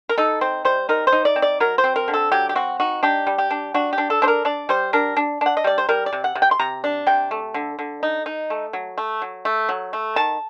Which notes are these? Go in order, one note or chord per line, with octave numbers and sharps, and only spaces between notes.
A#4
D#4 A4
C4 C5
G3 C5
D#4 A#4
C5
D#4
D5
C4
D5
F#3 A#4
C5
C4
A#4
D3
A4
F#3 G4
G4
C4 F#4
D#4 F#4
D4 G4
G3
G4
D4
D4 F#4
G4
D4
A4
D4 C5
A#4
D4 D5
G3 C5
D4 A#4
D4
D4 F#5
D#5
G3 D5
C5
G3 A#4
D5
C3
F#5
C3
G5
C6
C3 A#5
D4
C3 G5
A3
D3
D3
D#4
D#4
A3
F#3
A3
F#3
A3
F#3
A3
D#3 A5